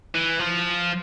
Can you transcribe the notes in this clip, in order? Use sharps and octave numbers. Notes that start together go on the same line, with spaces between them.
E3
F3